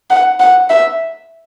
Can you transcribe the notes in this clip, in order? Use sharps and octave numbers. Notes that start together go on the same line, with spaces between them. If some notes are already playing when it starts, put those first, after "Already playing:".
F#5
F#5
E5